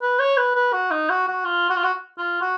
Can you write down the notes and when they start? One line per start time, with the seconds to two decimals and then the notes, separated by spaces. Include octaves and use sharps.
0.02 B4
0.19 C#5
0.37 B4
0.55 B4
0.73 F#4
0.91 D#4
1.10 F#4
1.28 F#4
1.45 F4
1.70 F#4
1.76 F4
1.84 F#4
2.18 F4
2.41 F#4